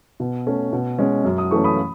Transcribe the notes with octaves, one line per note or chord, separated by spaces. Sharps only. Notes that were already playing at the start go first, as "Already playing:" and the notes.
B2
A3 C#4
B2
G#3 C#4
F#2
D#6
E3 A3 C#4 C#6
B5 D#6